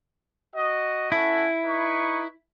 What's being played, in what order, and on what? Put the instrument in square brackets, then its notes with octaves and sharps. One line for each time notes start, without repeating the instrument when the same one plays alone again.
[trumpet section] F#4 D#5
[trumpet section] C#4 F#4 A4 [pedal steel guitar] E4
[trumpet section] D#4 B4 C#6